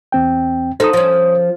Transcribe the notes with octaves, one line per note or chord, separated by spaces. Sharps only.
E2 C4 G5
D#4 A4 C5 D#6
F3 C#4